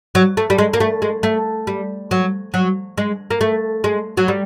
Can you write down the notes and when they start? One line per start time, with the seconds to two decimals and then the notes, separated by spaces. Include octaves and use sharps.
0.15 F#3
0.37 A3
0.50 G3
0.58 G#3
0.73 A#3
0.80 A3
1.02 G#3
1.23 A3
1.67 G3
2.11 F#3
2.54 F#3
2.98 G#3
3.30 A#3
3.41 A3
3.84 G#3
4.17 F#3
4.28 G3